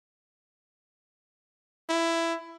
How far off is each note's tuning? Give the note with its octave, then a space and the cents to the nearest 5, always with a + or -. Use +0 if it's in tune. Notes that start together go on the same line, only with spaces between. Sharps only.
E4 +15